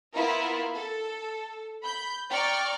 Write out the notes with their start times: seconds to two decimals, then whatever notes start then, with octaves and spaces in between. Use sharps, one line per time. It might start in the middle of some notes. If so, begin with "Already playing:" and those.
0.12 B3 E4 F4 A#4
0.74 A4
1.82 B5 G6
2.29 D5 G5 A#5 C#6 F6